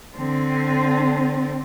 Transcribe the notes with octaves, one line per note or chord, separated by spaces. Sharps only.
D3 C4